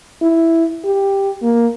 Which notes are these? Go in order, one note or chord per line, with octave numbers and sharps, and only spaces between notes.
E4
G4
A#3